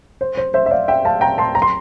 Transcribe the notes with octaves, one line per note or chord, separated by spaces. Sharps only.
C5
C5
C5 E5
E5
D5 F5
E5 G5
F5 A5
G5 A#5
A5 C6
A#5
C6